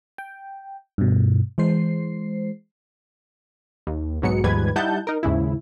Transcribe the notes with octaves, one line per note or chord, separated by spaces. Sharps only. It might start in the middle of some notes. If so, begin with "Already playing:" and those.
G5
G2 B2
E3 G#3 C5 C7
D#2
B1 G#2 F#3 B3 C#7
D#2 G#2 F3 G3 B4 G#6
G3 D#4 E4 F#5 A5 G6
D#4 A#4
D#2 G#2 C#3 E4